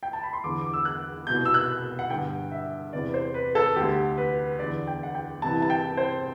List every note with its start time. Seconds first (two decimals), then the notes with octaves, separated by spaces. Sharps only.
0.03 G5
0.13 A5
0.23 B5
0.33 C6
0.44 E2 D3 D6
0.61 D6
0.73 E6
0.85 F#6
1.27 C2 B2 G6
1.45 E6
1.54 F#6
1.99 F#5
2.10 G2 D3 G5
2.51 E5
2.93 E2 C3 E3 D5
3.14 C5
3.34 B4
3.55 A4
3.76 D2 D3 G4
4.17 B4
4.59 E2 D3 D5
4.87 G5
5.03 F#5
5.14 G5
5.42 C2 C3 E3 A5
5.62 A5
5.70 G5
5.97 C5